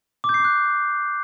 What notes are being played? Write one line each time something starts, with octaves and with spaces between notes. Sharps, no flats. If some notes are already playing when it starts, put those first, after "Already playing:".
D6
G6
C7
D6
F#6